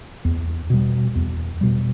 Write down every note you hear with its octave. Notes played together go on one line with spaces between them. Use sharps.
E2
B2 G3
E2
B2 G3